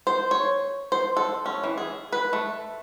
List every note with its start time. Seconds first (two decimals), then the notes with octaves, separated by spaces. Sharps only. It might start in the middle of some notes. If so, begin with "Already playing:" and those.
0.07 C5
0.31 C#5
0.92 C5
1.17 A4
1.46 C#4
1.64 E3
1.78 G#4
2.13 B4
2.33 A3